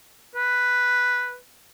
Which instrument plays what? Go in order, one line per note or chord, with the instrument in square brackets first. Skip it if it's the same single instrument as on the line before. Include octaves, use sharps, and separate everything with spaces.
[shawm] B4